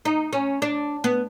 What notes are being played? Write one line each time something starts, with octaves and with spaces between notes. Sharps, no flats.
D#4
C#4
D4
B3